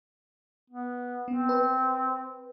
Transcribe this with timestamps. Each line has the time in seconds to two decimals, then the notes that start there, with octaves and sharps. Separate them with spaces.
0.70 B3
1.28 B3 C4
1.49 B4